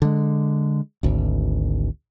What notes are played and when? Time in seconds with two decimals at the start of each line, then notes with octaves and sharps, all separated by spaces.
0.02 D3 G#3
1.03 G#1 D2